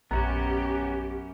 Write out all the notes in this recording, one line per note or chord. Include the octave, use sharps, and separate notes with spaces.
A#1 F#2 B3 C#4 F#4 G4 A#5